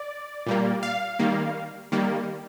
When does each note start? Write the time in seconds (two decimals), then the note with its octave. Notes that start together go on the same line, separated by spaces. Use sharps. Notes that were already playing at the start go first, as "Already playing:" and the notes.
Already playing: D5
0.46 A#2 G3 A#3
0.83 F5
1.19 D#3 G3 A#3
1.92 D#3 G3 A#3